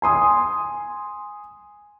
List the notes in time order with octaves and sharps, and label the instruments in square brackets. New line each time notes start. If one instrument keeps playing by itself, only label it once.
[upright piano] G#5 C6 D#6